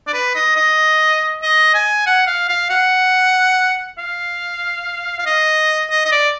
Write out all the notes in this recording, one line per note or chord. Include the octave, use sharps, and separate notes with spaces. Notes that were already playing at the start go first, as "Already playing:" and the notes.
D5
B4
D#5
D#5
D#5
G#5
F#5
F5
F5
F#5
F5
F5
D#5
D#5
D#5
D5